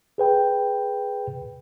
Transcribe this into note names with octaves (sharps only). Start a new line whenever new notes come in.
G#4 B4 G5